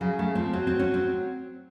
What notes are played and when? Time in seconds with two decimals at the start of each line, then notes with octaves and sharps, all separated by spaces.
0.01 C#3 F#3
0.18 C#3 A3
0.35 F3 C4
0.53 F#3 C4
0.67 C4
0.79 C#4
0.94 C4